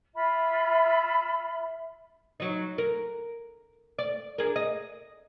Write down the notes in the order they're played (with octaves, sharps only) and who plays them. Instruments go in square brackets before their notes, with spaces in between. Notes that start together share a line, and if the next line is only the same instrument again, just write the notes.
[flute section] F4 B5 [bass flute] E5
[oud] F#3 D#4
A#4
D5
D4 G#4 A#4
D#5